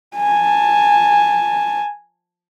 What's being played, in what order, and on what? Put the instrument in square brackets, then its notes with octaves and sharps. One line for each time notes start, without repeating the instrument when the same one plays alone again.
[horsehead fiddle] G#5 A5